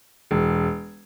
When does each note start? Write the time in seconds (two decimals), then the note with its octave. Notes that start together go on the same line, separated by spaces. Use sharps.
0.31 E1